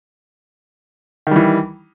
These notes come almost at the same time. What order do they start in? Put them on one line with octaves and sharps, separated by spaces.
D#3 G3 E3